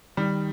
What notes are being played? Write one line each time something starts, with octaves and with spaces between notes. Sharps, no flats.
D#3 G3